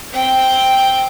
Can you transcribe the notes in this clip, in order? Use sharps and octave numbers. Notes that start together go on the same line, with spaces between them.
C4 G5